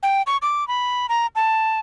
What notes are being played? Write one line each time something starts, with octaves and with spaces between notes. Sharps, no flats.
G5
C#6
D6
B5
A#5
A5